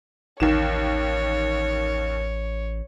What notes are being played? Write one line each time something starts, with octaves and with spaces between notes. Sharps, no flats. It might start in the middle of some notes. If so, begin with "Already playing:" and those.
A1 D#2 D#3 C#5 E7